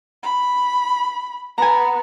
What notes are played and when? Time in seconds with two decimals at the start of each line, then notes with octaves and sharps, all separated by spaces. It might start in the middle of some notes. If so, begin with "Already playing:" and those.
0.23 B5
1.58 B3 G#5 A#5